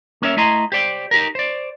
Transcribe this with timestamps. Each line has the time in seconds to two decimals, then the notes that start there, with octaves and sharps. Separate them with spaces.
0.22 A#3 C#4 A#4 C#5 D#5 E5
0.37 A3 E4 D#5 A#5 C6
0.72 G4 C5 D5 G5
1.11 D#4 G4 A#4
1.35 C5 D5